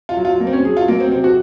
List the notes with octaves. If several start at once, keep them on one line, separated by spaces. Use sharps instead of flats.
F4
F#3
F4
F#3 A#3
C4
C#4
F#3 G#4
F4
F#3 A#3
C4
C3 C4
F#4